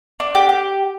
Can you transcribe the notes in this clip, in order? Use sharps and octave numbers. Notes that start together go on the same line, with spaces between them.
D4
G4
G4